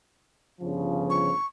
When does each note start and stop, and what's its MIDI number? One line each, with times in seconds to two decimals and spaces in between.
0.61 1.31 31
0.61 1.31 49
0.61 1.31 53
1.10 1.47 85